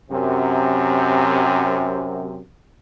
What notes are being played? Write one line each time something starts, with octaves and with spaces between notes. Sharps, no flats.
F#2 C3